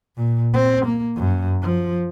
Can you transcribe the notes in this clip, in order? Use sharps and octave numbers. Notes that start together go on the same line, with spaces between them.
A#2
C4
A#3
F#2
F3